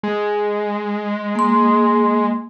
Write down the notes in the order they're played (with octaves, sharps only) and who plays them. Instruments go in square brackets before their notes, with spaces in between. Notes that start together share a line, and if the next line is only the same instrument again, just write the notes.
[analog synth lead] G#3
[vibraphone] A#3 C6